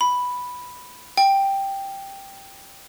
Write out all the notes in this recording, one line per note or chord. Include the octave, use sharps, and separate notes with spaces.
B5
G5